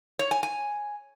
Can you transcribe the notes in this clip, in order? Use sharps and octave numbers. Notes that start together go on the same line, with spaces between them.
C#5
G#5
G#5